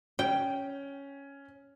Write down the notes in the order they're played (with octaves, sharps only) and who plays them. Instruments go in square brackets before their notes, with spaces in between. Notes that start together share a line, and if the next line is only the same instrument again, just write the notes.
[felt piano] C#4 [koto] G5